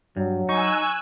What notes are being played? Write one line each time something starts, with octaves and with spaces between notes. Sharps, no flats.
G2 F#3
D#4 G#5 C#6 E6 F#6